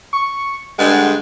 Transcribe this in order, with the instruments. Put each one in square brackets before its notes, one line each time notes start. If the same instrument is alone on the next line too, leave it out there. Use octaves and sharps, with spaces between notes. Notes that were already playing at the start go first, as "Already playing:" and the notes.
[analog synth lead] C#6
[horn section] G2 D3 G#3 [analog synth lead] F#5